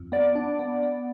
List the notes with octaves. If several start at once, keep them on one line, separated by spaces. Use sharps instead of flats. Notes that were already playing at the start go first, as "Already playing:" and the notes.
Already playing: F2
B3 D5
D4
B3
B3